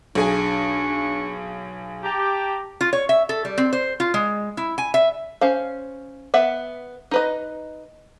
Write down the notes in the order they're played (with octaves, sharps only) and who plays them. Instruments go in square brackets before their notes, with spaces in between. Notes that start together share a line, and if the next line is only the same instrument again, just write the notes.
[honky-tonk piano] B1 G#4 G#5 [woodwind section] D4 C#6
[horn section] G4 [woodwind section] A5 A#5
[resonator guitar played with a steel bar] F4
C#5
E5
A4
G3
C4
C5
F4
G#3
E4
G#5
E5
[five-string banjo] C#4 C5 F5
B3 E5 F#5
D#4 B4 D#5